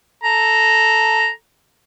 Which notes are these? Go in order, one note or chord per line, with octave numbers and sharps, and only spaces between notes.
A4 A#5